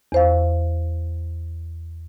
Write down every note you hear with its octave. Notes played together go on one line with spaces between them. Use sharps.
E2 C5 F5